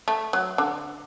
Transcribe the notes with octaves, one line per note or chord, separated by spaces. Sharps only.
A3
F#3
D3